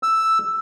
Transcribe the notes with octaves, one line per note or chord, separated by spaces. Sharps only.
E6